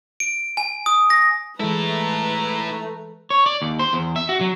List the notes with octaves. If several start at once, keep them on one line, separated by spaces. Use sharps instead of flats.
D7
G#5
D#6
A#6
E3 G#3 A3 E4 A4 B4 A#5
C#5
D5
D#2
C5
E2
E5
F#4
F#3